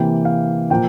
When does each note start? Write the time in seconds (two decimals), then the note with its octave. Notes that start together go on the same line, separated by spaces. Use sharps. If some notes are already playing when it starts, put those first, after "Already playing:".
Already playing: C3 E3 A#3 G5
0.25 F5
0.70 A#2 F3 A#3 G5